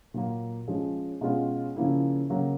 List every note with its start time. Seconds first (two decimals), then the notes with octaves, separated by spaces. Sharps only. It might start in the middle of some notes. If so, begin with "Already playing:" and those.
0.14 A#2 F#3 A#3
0.68 F3 G#3 C#4
1.21 B2 G#3 C#4 F4
1.76 C#3 F3 A#3 C#4 E4
2.30 C#3 F#3 A#3